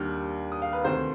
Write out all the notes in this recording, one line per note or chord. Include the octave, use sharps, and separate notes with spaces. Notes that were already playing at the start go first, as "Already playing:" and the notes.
Already playing: D#2 D#3 G3 D4 F6 G6
D#6
F5
B4
D2 C3 D#3 C5